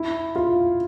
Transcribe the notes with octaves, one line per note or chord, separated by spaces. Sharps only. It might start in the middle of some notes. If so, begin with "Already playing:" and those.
Already playing: E4
F4